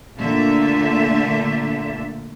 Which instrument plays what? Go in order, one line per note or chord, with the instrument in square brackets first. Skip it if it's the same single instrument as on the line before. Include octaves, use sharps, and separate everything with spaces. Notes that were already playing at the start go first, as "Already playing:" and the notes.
[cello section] A#2 D3 A3 A#3 D4 E5